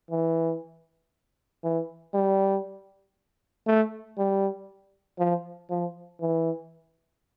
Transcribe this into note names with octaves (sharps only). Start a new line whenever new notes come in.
E3
E3
G3
A3
G3
F3
F3
E3